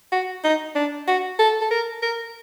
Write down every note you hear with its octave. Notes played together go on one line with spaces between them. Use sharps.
F#4
D#4
D4
F#4
A4
A4
A#4
A#4